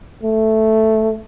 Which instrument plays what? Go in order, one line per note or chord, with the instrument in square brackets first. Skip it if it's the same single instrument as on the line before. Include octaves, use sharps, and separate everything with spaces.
[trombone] A3